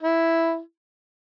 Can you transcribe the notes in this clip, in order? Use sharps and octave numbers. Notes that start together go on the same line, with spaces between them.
E4